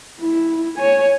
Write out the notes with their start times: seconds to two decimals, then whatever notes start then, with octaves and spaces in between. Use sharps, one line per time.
0.20 E4
0.77 C#5 G#5